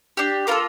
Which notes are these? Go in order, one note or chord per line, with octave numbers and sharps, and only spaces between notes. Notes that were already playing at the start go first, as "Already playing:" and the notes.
D4 G4
A#3 F4 A4 A#4